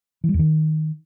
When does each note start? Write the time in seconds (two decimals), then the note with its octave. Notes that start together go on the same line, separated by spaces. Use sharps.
0.24 E3
0.29 G3
0.34 E2
0.39 D#3